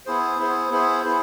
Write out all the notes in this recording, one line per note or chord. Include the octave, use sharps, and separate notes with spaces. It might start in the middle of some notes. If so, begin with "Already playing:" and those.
B3 E4 G#4 C5
B3 E4 G#4 C5
B3 E4 G#4 C5
B3 E4 G#4 C5